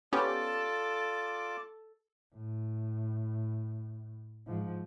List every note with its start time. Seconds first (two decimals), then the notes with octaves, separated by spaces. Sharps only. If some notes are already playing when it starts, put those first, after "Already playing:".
0.13 B3 C#4 F4 G4 A4 D5 D6
2.35 A2
4.47 G#2 F3